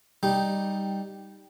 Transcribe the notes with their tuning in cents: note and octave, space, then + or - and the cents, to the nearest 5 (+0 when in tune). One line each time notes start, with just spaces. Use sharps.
G3 +0 D#4 +0